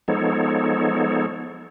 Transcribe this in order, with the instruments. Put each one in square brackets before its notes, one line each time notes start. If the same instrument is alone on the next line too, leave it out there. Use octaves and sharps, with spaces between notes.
[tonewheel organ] F3 G#3 B3 D#4 A4 C#5